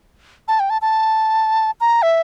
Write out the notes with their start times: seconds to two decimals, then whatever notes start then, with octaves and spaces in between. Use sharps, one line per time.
0.48 A5
0.60 G5
0.70 A5
0.82 A5
1.81 A#5
2.02 E5